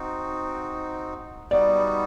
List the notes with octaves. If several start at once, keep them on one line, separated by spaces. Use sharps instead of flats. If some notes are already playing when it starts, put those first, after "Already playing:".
Already playing: C4 D#4 F#4
G3 B3 D#4 F#4 D5